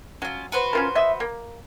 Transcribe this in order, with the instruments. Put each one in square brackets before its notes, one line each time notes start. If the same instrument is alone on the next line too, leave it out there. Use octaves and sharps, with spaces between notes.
[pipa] F#3 [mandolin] C#4 F4
[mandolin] F#4 B4 C5
[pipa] C#4 F4 A#4
D#5 E5
A#3